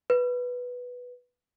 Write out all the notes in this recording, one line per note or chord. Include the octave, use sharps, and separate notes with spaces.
B4